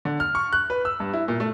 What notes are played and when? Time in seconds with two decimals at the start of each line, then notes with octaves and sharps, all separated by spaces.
0.05 D3
0.20 F6
0.35 C#6
0.53 F#6
0.70 B4
0.85 E6
1.00 G2
1.13 E4
1.28 A#2
1.40 A3